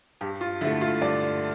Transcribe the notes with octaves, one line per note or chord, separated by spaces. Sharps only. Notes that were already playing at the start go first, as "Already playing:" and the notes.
G2 G4
F4
D3 A3 E4
F4
G2 D5